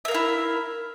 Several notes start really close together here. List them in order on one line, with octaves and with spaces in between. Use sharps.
E5 A#4 F5 E4